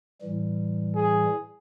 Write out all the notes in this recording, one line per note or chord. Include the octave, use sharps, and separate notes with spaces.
A2 E3 G3
G#4